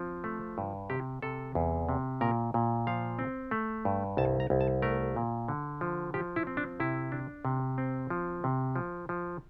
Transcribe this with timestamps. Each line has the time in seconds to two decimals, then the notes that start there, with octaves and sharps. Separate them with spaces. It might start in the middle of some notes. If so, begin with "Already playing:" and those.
Already playing: F3 C4
0.24 A3
0.58 G2
0.90 C3 G4
1.22 C3 A4
1.55 E2
1.89 C3
2.21 A#2 A#4
2.54 A#2
2.87 F3 F5
3.19 C4
3.51 A3
3.85 G2
4.17 C2 A5
4.40 A#5
4.50 C2
4.61 A5
4.82 A3 A#4
5.16 A#2
5.48 D3
5.81 F3
6.14 F3 G4
6.36 E4
6.47 C4
6.57 D4
6.80 C3 E4
7.12 D4
7.45 C3
7.78 C4
8.10 F3
8.44 C3
8.76 F3
9.09 F3